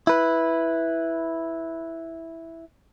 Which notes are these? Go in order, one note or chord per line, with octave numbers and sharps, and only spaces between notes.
E4 B4